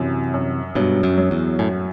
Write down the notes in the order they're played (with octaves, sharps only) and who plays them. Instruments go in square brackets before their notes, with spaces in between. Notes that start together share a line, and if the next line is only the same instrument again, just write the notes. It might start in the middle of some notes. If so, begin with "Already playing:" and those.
Already playing: [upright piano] F#2 F#3 [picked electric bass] C3 E3
[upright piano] F#2
[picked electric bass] G2 B2 [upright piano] F#3
[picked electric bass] F#2
[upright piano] F#3
[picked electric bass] E2
[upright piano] F#2 [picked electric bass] A2